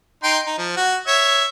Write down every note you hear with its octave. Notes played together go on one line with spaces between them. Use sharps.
D#4 G5 C6
D#4
F3
F#4
C#5 E5